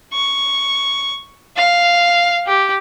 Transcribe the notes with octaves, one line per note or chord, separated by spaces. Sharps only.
C#6
F5
G4